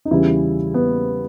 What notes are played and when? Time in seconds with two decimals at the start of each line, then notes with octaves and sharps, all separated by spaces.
0.05 D#4
0.11 E2 C#3 E3 G3 E4
0.74 B3